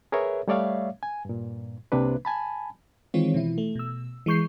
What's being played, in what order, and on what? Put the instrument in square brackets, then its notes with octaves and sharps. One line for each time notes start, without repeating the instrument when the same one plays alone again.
[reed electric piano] G#4 A#4 B4 C#5 E5
G3 A3 C#5 D5 E5 F5
G#5
G2 A#2
C2 C3 A#3 D4 B4
G#5 A5 B5
[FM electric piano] D#3 E3 G#3 C4 F4 C#5
B2 E3 E4
A3
B2 E6
E3 G#3 C#6 G6 C7